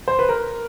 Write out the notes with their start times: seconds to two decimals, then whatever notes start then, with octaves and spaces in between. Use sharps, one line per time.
0.08 C5
0.19 B4
0.29 A#4